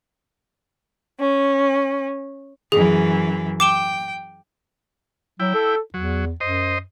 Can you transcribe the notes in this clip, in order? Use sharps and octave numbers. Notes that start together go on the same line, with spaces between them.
C#4
F#2 E3 G#4
G5 D6 E7 G7
F#3 E4 G5
A4
E2 F#3
F#2 C5 D#5